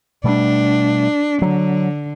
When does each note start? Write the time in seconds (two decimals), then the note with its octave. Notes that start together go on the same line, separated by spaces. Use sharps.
0.24 B2 G3 A3 D4
1.42 D3 F#3